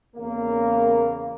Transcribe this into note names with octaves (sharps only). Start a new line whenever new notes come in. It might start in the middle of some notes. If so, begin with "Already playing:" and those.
E2 C#3 A#3